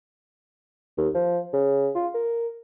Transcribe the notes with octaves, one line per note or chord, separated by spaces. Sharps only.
D#2
F3
C#3
F4
A#4